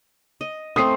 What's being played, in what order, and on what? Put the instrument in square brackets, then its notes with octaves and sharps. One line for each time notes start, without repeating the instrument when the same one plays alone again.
[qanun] D#5
[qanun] A3 C4 [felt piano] D#6 C7